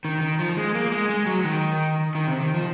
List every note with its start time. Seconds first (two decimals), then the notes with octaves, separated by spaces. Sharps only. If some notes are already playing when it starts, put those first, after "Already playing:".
0.05 D#3
0.21 D#3
0.39 F3
0.57 G#3
0.75 A#3
0.92 G#3
1.09 G#3
1.26 F#3
1.44 D#3
2.15 D#3
2.27 C3
2.41 D#3
2.54 F3